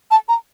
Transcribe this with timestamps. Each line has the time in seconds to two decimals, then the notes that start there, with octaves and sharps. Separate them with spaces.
0.11 A5
0.29 A#5